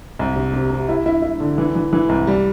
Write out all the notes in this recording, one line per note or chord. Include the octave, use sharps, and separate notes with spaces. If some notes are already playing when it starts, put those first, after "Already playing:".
C2
C3
C3
C3
E4
E4
E4
D3
E3
E3
E3
C2
G3